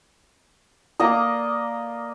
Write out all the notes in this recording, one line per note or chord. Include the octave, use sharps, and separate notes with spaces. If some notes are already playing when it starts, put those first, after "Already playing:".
A#3 D5 D#5 A#5